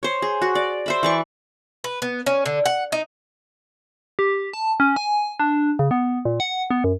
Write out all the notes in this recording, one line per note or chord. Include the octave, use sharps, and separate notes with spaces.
C5 C#5
G#4
F#4
D5
C5 E5 B5
E3 D5 C#6
B4
B3
C#4
D3
F#5
D#4
G4
A5
C#4
G#5
D4
C#3
B3
A#2
F#5
B3
F#2